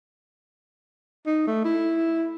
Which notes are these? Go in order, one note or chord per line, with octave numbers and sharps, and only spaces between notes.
D#4
A3
E4